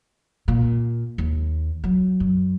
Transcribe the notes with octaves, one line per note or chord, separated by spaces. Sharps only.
A#2
D#2
F#3
F#2